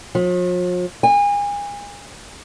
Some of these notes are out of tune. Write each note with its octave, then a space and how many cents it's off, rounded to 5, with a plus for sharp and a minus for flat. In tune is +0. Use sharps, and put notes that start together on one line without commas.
F3 +45
G#5 -30